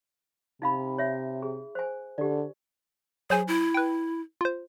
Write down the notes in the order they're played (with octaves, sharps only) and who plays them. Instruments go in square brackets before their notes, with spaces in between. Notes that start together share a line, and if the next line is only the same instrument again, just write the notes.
[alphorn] C3 [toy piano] D#4 F5 B5
[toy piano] C#5 E5
G#4
C5 G#5
[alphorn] D3 [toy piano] G4 D5
[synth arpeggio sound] F#3 C5 G#5 [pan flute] G#4
[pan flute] E4
[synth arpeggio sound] B4 G5
F4 C5